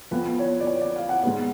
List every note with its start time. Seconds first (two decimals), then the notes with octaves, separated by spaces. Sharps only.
0.11 F2 F3 B3 B4
0.39 C#5
0.60 D5
0.67 C#5
0.81 D5
0.96 F5
1.09 F#5
1.23 G#2 G#3 B3